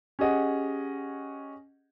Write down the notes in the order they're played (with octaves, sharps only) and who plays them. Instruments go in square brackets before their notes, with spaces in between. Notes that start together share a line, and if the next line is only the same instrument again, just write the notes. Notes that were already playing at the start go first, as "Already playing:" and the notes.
[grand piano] C#4 G4 G#4 D#5 F#5